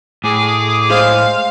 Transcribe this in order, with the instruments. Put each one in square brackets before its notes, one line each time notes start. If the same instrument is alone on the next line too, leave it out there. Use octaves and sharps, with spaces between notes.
[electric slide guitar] A2 [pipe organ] G#4 G#5 D6
[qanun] G#3 C5 [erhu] F5